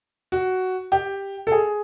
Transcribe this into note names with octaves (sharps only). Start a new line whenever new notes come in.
F#4
G4
A4
G#4